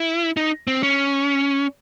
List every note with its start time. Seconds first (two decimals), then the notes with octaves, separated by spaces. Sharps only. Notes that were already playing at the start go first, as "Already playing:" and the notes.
Already playing: E4
0.37 D#4
0.67 C4
0.83 C#4